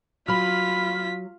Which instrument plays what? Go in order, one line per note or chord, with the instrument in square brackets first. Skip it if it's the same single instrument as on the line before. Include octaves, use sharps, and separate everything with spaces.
[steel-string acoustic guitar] F#3 [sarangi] F4 [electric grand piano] B5 F6 [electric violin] B6